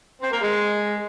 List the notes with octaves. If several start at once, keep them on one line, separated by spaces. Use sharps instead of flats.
C4
A#3
G#3